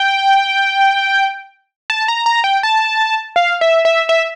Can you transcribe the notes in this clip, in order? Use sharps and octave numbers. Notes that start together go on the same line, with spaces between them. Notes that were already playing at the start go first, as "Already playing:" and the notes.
Already playing: G5
A5
A#5
A#5
G5
A5
F5
E5
E5
E5